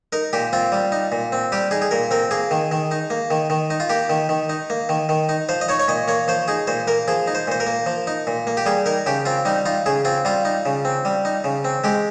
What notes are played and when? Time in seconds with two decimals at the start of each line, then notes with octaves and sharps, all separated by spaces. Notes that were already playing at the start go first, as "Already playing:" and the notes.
0.13 D#4 A#4
0.33 A#2 G4
0.53 C4 F4
0.72 G3
0.92 D#4
1.12 A#2
1.32 C4
1.52 G3 G4
1.71 D#4 G#4
1.82 G#4
1.91 A#2 A#4
2.11 C4 A#4
2.31 A#3 G#4
2.51 D#3
2.72 D#3
2.91 D#4
3.10 A#3
3.31 D#3
3.50 D#3
3.70 D#4
3.80 F4
3.89 A#3 G4
4.10 D#3
4.29 D#3
4.49 D#4
4.70 A#3
4.89 D#3
5.09 D#3
5.29 D#4
5.49 F3 C5
5.61 D#5
5.68 D#4 C#5
5.79 C#5
5.88 A#2 D#5
6.08 A#3 C#5
6.28 F3 C5
6.48 D#4 G#4
6.67 A#2 C5
6.87 A#3 A#4
7.08 F3 G#4
7.27 D#4
7.35 C5
7.47 A#2 C5
7.60 A#4
7.67 A#3
7.86 F3
8.07 D#4
8.27 A#2
8.47 A#3
8.57 G4
8.66 G3 G#4
8.86 D#4 A#4
9.06 C#3 G4
9.25 C4 F4
9.45 G3 D#4
9.66 D#4 F4
9.86 C#3 G#4
10.05 C4 F4
10.25 G3 F4
10.45 D#4
10.66 C#3
10.85 C4
11.05 G3
11.25 D#4
11.44 C#3
11.65 C4
11.84 G#3 G4